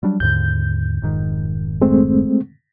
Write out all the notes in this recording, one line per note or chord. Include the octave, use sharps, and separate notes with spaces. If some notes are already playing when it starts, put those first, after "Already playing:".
F#3 G3 D4
D#2 G#2 D3 G6
F1 G#2 D#3
G#3 A3 C4